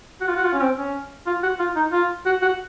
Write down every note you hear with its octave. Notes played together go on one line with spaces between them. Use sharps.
F#4
F4
F#4
F4
C#4
C4
C#4
F4
F#4
F4
D#4
F4
F#4
F#4